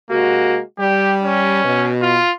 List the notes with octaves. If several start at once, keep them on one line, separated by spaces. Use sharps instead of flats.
C3 G#3 A#3 F#4
G3 G4
C#4
B2
F4